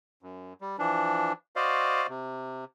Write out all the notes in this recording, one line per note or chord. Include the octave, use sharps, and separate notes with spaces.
F#2
G3
E3 F3 D4
F#4 C5 D5 D#5 F5
C3